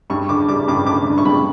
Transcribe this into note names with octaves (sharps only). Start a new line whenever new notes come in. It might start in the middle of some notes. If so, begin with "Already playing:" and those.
G2 C#6
D3 D6
G3 D6
G2 D6
D3 D6
D3
C#6
G2 B5